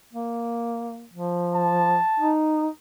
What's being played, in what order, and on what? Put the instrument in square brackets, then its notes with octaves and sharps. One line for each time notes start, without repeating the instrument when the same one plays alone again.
[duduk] A#3
F3
[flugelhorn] A5
[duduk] D#4